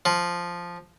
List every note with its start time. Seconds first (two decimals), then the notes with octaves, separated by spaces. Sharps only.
0.05 F3